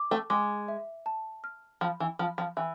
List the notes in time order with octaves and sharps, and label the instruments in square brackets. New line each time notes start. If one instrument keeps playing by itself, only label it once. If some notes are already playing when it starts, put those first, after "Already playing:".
Already playing: [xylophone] D6
[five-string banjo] A3
[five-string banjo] G#3 [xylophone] D6
[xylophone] E5
A5
F6
[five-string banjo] F3 [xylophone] B5
[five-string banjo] E3
[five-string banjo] F3 [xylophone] B5
[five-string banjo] F3
[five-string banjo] E3 [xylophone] E5